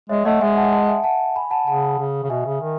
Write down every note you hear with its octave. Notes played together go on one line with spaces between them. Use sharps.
G#3 C#5 E5
A3 D#5 F#5
G#3 E5 G#5
F#5 A5
F#5 A5
E5 G#5
F#5 A5
G#5 B5
F#5 A5
C#3 F#5 A5
C#3
C#3
B2 E5 G#5
C#3
D#3